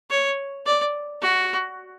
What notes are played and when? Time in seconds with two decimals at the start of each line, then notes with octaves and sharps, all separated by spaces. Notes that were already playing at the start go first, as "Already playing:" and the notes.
0.10 C#5
0.66 D5
1.22 F#4